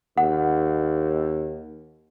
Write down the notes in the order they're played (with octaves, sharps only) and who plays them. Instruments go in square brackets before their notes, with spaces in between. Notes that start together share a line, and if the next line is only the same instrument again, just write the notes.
[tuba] D#2 [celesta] F#5